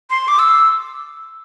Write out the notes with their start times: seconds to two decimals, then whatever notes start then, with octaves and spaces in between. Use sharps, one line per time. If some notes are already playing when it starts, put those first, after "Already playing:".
0.10 C6
0.28 D6
0.39 E6